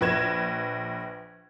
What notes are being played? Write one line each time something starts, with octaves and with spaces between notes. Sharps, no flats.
A#1 B4 G#6 E7